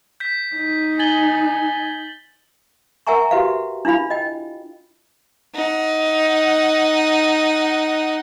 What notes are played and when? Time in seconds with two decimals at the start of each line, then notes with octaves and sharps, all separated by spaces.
0.20 G6 B6
0.56 D#4
0.99 G#5 A6 F#7 G7
3.07 A#4 E5 F#5 G#5 A#5 C#6
3.31 F#4 G4 B4 E5 F5
3.85 D4 E4 F4 F5 B5
4.10 D#5 G5
5.55 D#4 F#5